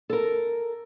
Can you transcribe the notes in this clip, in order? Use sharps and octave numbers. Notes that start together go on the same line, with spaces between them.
A4 A#4